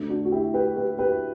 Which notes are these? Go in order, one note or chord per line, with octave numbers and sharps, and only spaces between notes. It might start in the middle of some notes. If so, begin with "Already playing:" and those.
Already playing: D2 D3 A3
D4 F#4
F#4
E4 G4
G4 B4
G4 B4
G4 B4